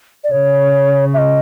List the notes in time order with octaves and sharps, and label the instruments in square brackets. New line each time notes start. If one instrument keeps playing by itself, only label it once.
[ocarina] D5
[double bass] C#3 [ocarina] C#5
[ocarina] E5
D#5